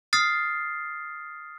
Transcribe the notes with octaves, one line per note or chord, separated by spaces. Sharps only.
D#6 F6 A6 C7